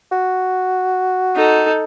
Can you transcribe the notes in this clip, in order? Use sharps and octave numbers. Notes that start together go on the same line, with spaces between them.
F#4
D#4 A4